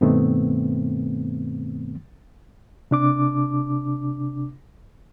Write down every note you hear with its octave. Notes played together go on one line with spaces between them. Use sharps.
G2 B2 D#3 A3 B3 C4
C3 D4 D6